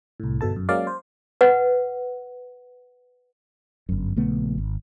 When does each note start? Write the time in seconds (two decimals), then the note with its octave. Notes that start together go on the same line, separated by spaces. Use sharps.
0.20 C2 A2
0.41 G1 B2 A4 A5
0.56 F#2
0.69 F#3 G#3 A#3 C#4 D5 F5
0.87 C5
1.41 B4 F#5
3.89 G1 F#2
4.16 A#1 C#3 A3 B3
4.58 G#1